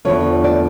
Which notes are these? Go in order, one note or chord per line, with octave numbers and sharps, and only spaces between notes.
E2 D3 F3 C#5
D5